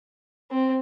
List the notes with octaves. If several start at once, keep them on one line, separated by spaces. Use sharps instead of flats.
C4